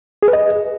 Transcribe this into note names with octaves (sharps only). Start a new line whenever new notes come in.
G#4
B4
D#5